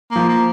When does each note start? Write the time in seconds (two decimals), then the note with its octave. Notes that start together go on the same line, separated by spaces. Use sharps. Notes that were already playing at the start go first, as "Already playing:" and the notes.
0.11 A#3
0.16 F3
0.28 A#3